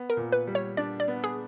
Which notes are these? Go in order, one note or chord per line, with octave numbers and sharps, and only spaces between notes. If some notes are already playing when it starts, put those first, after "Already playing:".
Already playing: B3
A#4
A#2
B4
G3
C#5
D4 D5
D5
B3
G#4